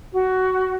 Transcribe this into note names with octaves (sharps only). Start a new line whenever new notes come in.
F#4